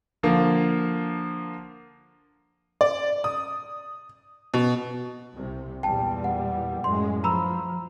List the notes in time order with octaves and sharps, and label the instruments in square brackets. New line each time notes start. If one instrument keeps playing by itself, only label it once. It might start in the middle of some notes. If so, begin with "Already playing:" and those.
[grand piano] D3 F3 A#3
[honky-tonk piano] D5
D#6
B2
[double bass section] C2 C3
[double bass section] E2 A#2 G3 [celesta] G5 A5
[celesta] F#5
[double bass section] F#2 A2 G#3 [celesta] C6
[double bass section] F3 [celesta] A#5 B5 E6